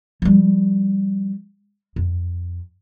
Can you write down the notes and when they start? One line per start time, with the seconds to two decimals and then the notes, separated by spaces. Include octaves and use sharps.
0.22 F3 G3
1.96 F2